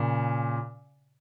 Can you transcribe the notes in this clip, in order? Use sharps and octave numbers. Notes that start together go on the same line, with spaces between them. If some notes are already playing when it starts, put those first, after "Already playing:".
Already playing: A#2 C#3